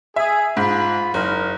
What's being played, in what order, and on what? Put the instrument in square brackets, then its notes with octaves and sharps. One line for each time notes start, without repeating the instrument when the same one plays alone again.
[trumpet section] G#4 [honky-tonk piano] E5
[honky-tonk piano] G#2 [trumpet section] F4 B5
[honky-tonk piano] F#1 [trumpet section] D#4 A#4